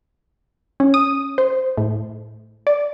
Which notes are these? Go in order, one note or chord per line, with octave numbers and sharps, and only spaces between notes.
C#4
D#6
C5
A2
D5